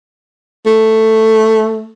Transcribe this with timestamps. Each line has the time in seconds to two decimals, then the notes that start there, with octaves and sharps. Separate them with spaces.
0.66 A3